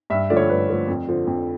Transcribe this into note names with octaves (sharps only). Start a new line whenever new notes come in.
G2 E5
D3 F3 A3 D5
C#5
G2 B4
D3 F3 A3
F2
D3 F3
F2